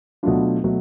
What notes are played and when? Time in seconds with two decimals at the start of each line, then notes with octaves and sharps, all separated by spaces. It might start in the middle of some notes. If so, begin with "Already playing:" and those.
0.23 B2 F#3 A3 D4 F4
0.64 B2 F#3 A3